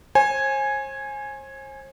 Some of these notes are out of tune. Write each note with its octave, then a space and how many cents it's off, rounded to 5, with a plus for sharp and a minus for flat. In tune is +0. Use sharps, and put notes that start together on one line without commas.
C5 +45 G#5 +0